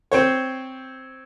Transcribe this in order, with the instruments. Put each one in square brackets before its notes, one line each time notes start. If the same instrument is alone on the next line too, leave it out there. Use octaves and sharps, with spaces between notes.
[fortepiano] C4 C5 C#5